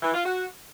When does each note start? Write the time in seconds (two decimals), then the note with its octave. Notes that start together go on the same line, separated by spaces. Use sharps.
0.03 E3
0.14 F4
0.25 F#4